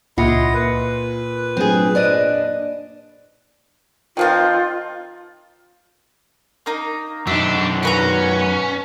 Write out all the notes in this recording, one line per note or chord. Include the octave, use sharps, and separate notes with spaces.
C#2 A#2 E4 F4 D#5 F#5
A#4 B4
F#3 A3 C4 D4 G#4
D4 C5 D5 D#5
D#3 F3 C4 F4
A#3 D#4
F#2 D4 D#4 E5
C#4 F#4 B4 A#5